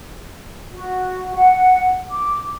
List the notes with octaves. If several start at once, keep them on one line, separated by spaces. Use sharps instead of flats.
F#4
F#5
D6